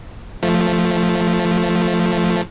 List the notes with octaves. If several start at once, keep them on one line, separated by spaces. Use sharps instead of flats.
F3 A3